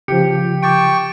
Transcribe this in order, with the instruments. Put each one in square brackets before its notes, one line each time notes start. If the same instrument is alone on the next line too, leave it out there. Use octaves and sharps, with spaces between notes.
[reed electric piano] C#3 F3 [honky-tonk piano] G4 [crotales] C#7
[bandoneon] G5 C#6 [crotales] D6 A6 D7